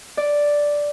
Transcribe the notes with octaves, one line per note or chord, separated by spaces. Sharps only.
D5